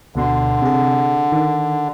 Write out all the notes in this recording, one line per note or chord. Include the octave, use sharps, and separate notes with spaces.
D2 B2 D3 C6
C3 G#4
D#3